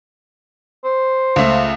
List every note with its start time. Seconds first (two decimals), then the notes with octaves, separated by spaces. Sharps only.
0.84 C5
1.36 C#2 A3